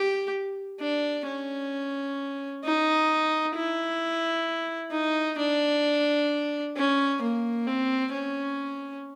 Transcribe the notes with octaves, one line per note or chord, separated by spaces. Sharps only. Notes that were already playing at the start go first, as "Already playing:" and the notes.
Already playing: G4
D4
C#4
D#4
E4
D#4
D4
C#4
A#3
C4
C#4